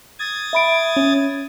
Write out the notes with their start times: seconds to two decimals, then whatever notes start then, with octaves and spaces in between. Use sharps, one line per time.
0.19 D#6 G#6 A6
0.53 E5 B5 D7
0.97 C#4